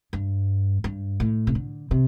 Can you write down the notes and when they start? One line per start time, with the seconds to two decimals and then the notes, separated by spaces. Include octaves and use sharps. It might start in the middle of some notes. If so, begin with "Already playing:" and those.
0.13 G2
0.84 G2
1.20 A2
1.47 C3
1.55 D3
1.91 C3